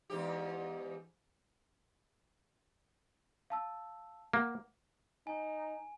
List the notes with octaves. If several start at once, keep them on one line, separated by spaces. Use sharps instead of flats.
E2 G#2 G4
F5 A5 E6
A#3 F#5
D#4 G#5